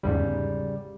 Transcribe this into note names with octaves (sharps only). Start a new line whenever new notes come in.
G1 E2 G#2 C#3 G3